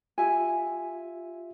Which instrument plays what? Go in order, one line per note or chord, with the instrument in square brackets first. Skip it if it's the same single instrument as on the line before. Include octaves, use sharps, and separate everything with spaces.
[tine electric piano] F4 G4 E5 [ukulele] G#5